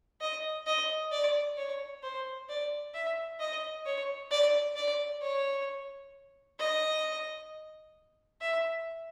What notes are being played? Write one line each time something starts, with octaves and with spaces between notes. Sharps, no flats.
D#5
D#5
D5
C#5
C5
D5
E5
D#5
C#5
D5
D5
C#5
D#5
E5